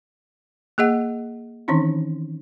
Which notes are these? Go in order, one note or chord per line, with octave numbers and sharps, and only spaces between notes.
A#3 G#4 D#5 F#5
D#3 E3 C4 C#4 D#4 E4